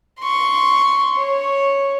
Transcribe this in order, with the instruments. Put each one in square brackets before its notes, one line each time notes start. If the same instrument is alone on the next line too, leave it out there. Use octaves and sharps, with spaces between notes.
[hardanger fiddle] C6 C#6
C#5